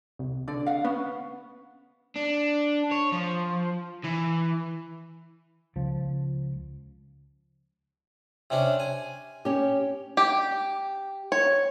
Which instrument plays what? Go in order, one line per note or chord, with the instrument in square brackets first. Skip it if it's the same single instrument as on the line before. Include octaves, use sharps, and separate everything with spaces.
[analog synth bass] C2
[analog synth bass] D3 [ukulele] D5
[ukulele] F5 F#5
[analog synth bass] B3 [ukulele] C#4
[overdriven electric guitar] D4
C#5
F3
E3
[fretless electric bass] C#2 F3
[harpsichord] C3 C#4 D4
G#5
[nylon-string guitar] C#4 G4
[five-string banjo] G4
C#5